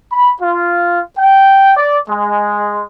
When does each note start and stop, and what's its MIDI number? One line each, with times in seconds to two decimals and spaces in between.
0.12 0.33 83
0.42 1.01 65
1.18 1.75 79
1.77 1.97 74
2.09 2.82 56